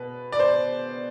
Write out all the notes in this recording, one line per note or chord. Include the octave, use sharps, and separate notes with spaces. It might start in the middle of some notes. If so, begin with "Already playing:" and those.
Already playing: B2 B4
D5
C5